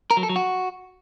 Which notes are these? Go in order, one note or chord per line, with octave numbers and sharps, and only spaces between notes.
A#4
F#3
A4
F#3
F#4